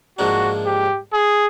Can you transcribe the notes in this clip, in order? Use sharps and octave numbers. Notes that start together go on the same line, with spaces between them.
G#2 F3 A#3 D4 F#4
G4
G#4